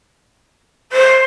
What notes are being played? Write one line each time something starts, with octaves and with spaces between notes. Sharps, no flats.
C5